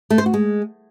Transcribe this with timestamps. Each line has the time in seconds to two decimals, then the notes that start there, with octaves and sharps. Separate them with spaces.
0.10 A3
0.18 C5
0.26 F#4
0.34 G#3